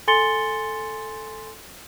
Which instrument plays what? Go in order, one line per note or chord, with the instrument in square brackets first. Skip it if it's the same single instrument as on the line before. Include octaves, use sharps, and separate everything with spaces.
[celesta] A4 G#5 C6 A6 C#7 G7